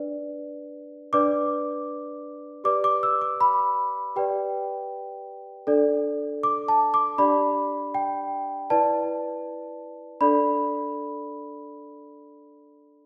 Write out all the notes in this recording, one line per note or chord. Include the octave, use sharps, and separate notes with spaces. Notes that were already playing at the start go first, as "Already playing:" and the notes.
Already playing: D4 B4 D5
D4 B4 D5 D6
G4 B4 D5 D6
D6
E6
D6
B5
G4 B4 D5 G5
D4 A4 D5
D6
A5
D6
D4 G4 D5 B5
G5
E4 B4 D5 A5
D4 A4 D5 B5